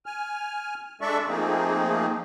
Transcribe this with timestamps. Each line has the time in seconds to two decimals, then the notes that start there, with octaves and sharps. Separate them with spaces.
0.06 G#5 F6
1.01 G#3 D4 A4 D5 E5 C#6
1.28 F3 A3 A#3 C4 D#4 G#4